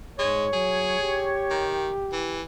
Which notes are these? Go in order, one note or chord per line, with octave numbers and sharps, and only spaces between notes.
G#2 G#3 C#5
F#3 G#4
G4
D#3
E3